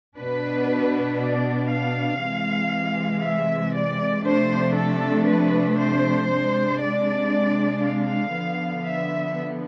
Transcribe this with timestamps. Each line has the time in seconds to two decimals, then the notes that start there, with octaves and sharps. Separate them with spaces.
0.17 B2 B3 D4 B4
1.19 D5
1.71 F5
2.22 C3 E3 G#3
3.23 E5
3.74 D5
4.26 C3 F3 A3 D4 C5
4.77 A4
5.29 B4
5.79 C5
6.30 C3 G#3 D4
6.82 D5
7.84 F5
8.34 D3 F3 B3
8.85 E5